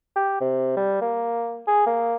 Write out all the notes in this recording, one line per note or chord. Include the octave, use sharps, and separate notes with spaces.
G4
C3
G3
A#3
G#4
A#3